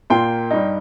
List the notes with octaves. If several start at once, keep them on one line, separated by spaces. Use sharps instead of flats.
A#2 A#3 F4 G5 C6
G2 G3 D#4